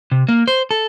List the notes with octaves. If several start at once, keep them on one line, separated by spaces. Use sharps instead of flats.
C3
A#3
C5
A4